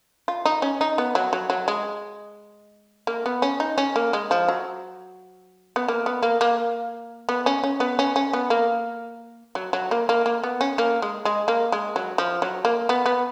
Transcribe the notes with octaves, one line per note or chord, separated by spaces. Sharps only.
F4
D#4
C#4
D#4
B3
F#3
F#3
F#3
G#3
A#3
B3
C#4
D#4
C#4
A#3
G#3
F3
F#3
B3
A#3
B3
A#3
A#3
B3
C#4
C#4
B3
C#4
C#4
B3
A#3
F#3
F#3
A#3
A#3
A#3
B3
C#4
A#3
G#3
G#3
A#3
G#3
F#3
F3
F#3
A#3
B3
B3